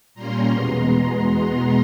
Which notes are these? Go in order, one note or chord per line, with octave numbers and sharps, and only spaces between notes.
A#2 G3 A#3 C#4 A#5 C6
E2 B2 G#3 B3